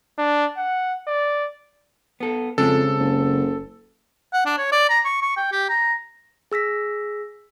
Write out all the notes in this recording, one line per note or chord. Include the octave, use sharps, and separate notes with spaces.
D4
F#5
D5
B3 A4
F2 C#3 G#3 C4 A4
F#1
F#5
D4
C#5
D5
A#5
C#6
C#6
G5
G4
A#5
G#4 E6 A#6 B6